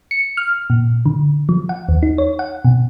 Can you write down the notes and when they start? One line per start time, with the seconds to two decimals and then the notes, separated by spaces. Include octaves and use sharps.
0.11 C#7
0.37 F6
0.70 A#2
1.06 D3
1.49 F3
1.69 F#5
1.89 D#2
2.03 D#4
2.18 C#5
2.39 F#5
2.65 B2